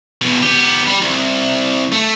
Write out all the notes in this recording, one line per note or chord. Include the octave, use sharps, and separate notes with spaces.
E2 B2
B3 G4
G3
C2
A3